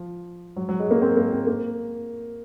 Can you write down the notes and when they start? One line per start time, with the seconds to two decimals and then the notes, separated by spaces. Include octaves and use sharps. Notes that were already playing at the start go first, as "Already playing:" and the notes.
Already playing: F3
0.56 F#3
0.69 F#3
0.80 G#3
0.91 A#3
1.02 C4
1.17 A#3
1.33 C4
1.47 A#3